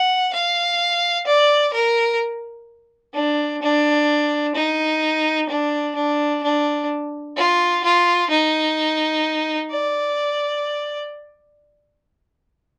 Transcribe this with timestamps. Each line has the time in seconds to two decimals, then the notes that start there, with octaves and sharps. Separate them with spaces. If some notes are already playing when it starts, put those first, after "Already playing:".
Already playing: F#5
0.33 F5
1.27 D5
1.73 A#4
3.14 D4
3.62 D4
4.55 D#4
5.49 D4
5.95 D4
6.43 D4
7.37 F4
7.84 F4
8.30 D#4
9.71 D5